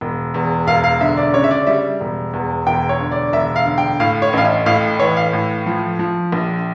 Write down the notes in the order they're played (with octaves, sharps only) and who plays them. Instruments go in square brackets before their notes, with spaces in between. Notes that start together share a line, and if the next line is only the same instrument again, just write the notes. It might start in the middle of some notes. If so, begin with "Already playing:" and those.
[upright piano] E1
E2
E1 F5
F5
D3 E5
D5
C#3 C#5
E5
D5
G3 E5
E1
E2
E1 G5
C#5
D3
D5
E1 E5
F5
D3
G5
A2 F5
C#5
A1 F5
E5
A2 F5
E3 C#5
F5
A2
F3
F3
A#1